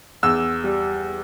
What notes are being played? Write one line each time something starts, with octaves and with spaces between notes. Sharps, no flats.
E2 E6
G3